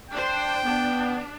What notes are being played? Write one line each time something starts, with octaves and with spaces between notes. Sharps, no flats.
D4 C5 G5
B3 D4